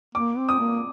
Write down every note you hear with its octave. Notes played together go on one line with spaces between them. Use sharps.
A#3 D6
C4
D#6
A#3